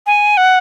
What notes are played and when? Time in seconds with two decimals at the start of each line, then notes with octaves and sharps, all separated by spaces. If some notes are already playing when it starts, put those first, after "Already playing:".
0.07 G#5
0.37 F#5